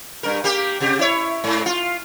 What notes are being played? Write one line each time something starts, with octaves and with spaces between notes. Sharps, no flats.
G2 A#4
A#3 G4
C3 G4
E4 C#5
G#2
F4